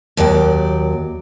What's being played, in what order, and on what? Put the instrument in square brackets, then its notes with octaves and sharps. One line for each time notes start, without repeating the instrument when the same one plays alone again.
[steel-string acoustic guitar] D#2 F#3 D5 G5